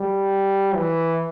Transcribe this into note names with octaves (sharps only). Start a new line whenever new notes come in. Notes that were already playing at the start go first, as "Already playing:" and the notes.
Already playing: G3
E3